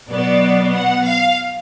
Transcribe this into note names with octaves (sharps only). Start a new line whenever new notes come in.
B2 F#3 B3 D5
F#5
F5